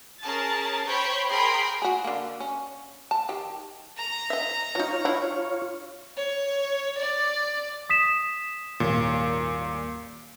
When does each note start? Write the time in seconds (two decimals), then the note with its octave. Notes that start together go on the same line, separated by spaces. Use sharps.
0.23 C#4 G#4 A#4 A5 A6
0.87 C5 C#5 G5 B5 C#6
1.30 G#4 A#4 G5 B5 C6
1.82 F#4 G#4
2.04 D3 A#3
2.40 C#4
3.11 A5
3.29 D#3 G4
3.98 A#5
4.30 D#5 E5
4.75 F#3 D#4 F4 C#5
5.05 D4 E4
6.17 C#5
6.97 D5
7.90 D#6 B6 E7
8.80 D#1 G#1 A#2 C#5